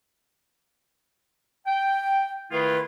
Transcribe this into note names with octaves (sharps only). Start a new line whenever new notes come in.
G5
D#3 A3 E4 F4 G#4 B4